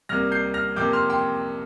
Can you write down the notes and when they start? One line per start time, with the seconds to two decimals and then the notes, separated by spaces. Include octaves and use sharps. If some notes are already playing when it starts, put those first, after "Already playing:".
0.09 C2 C3 A#3 F6 A#6
0.32 G6 C7
0.54 F6 A#6
0.76 F2 C3 A#3 D6 G6
0.93 C6 F6
1.10 G5 C6